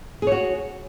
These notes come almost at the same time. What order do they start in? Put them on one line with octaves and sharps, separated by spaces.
G#4 C#5 F#4